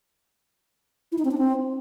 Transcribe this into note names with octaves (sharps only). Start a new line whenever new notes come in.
E4
D#4
C4
D4
C4